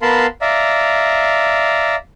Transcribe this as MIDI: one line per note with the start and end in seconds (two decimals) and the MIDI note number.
0.02 0.26 59
0.02 0.26 70
0.02 0.26 77
0.02 0.26 81
0.02 0.26 83
0.02 0.26 84
0.41 1.95 74
0.41 1.95 76
0.41 1.95 77
0.41 1.95 82